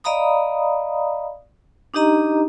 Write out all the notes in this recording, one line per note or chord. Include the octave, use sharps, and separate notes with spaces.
D5 D#5 F5 A#5 B5 D#6
D4 D#4 G4 D#5 A#5